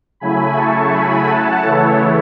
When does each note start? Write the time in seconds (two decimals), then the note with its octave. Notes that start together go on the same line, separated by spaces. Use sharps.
0.20 C#3 F#3 A3 E4 G#5 B5
0.56 A5 C#6
0.91 G#5 B5
1.27 F#5 A5
1.62 C#3 E3 A3 E4 A4 C#5